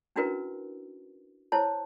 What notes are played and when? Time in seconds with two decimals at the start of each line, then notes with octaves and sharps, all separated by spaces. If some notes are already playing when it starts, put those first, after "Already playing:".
0.16 C#4 D4 E4 F#4 A#4 B4
1.52 E4 C5 C#5 A5